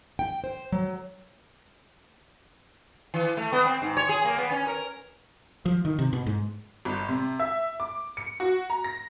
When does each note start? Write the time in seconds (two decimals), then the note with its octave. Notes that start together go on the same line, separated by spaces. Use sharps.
0.19 G5
0.44 C5
0.72 F#3
3.14 E3
3.37 A3
3.52 B3
3.65 C4
3.82 G#2
3.97 C#5
4.09 G#4
4.25 A#3
4.38 B3
4.51 C#4
4.67 A#4
5.65 F3
5.85 D#3
5.99 C3
6.13 B2
6.26 G#2
6.85 G1
7.09 C3
7.40 E5
7.80 D6
8.17 C#7
8.40 F#4
8.70 A#5
8.84 A#6